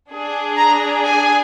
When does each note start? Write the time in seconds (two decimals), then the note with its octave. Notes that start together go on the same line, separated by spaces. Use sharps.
0.12 D4 G#4
0.57 A#5
1.04 G#5